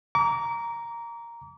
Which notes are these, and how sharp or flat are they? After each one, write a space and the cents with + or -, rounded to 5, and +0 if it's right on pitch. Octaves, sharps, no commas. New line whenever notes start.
A#5 +0 D6 -35